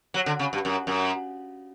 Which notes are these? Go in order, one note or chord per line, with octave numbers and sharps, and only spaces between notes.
F#3
D3
C#3
G2
F#2
F#2